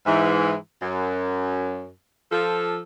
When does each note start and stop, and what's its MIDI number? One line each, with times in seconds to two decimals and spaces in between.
0.06 0.54 44
0.06 0.54 52
0.82 1.90 42
2.32 2.79 53
2.32 2.79 69